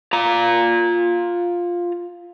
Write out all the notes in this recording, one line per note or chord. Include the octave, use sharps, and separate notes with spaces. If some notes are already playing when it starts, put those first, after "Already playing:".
F4 A#5